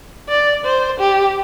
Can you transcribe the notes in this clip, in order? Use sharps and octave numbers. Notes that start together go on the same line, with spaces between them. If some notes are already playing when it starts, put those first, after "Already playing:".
D5
C5
G4